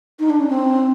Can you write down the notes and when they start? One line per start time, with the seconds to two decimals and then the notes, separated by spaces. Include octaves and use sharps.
0.20 D#4
0.30 D4
0.40 C#4
0.50 C4